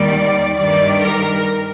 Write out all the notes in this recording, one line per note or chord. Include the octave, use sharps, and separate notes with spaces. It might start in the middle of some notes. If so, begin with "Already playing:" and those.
Already playing: D#2 D#3 G3 D5
G2 D#3 G3 D5
A#4